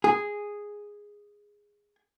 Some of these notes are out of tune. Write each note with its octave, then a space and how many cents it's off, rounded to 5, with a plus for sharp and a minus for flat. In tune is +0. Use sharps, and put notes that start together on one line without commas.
G#4 -5